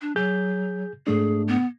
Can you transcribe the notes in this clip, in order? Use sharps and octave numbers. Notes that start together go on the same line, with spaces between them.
D4
F#3 G#4 G6
G#2 A3 D4 G#4
B3